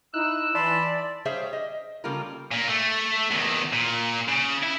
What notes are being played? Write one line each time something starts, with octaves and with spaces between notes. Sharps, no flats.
D#4 E4 E6 F#6
E3 D5 A5 B5 C6
G3 G#4 C5 C#5 E5 F5
D#5
C#3 G3 A#3 F4 A4 A#4
A#2 A#3
A3
E2 D#3
A#2
C#3
E4